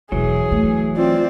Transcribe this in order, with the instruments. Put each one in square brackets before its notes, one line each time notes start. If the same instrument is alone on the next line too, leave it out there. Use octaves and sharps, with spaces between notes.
[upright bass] E1 [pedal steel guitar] E3 F#3 [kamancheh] G#4
[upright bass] A3
[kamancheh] C4 D5 [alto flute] F4